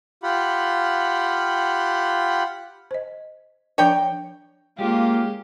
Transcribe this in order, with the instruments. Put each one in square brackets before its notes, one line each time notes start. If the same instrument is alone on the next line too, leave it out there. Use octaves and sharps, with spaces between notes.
[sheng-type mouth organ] F4 G4 F#5 B5
[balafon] C5 D#5
[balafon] F3 D4 D5 [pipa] C#5 G5
[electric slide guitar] G#3 [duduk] A#3 [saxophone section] C#4 G4 [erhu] F4